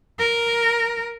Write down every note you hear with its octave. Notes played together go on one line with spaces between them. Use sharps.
A#4